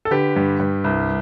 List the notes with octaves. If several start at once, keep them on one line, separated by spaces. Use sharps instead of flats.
A4
D3 G4 B4
G2
G2
C2